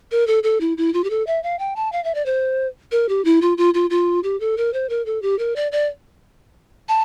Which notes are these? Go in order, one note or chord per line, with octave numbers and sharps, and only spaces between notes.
A#4
A4
A4
E4
E4
F4
G4
A4
E5
F5
G5
A5
F5
E5
D5
C5
A#4
G4
E4
F4
F4
F4
F4
G4
A4
A#4
C5
A#4
A4
G4
A#4
D5
D5
A5